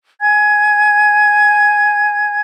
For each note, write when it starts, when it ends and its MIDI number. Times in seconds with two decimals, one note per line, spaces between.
0.20 2.41 80
0.20 2.41 92